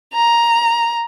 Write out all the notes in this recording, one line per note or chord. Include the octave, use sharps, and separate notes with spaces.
A#5